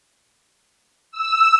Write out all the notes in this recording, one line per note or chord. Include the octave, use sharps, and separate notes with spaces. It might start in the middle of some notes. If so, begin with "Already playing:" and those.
E6